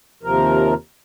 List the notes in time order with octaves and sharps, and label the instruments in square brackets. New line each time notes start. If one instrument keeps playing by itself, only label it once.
[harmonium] D#2 C3 F3 A#4